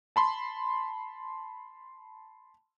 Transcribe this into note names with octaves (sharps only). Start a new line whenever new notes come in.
A5 B5 C6